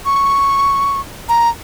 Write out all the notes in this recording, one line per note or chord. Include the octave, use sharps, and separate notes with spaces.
C#6
A#5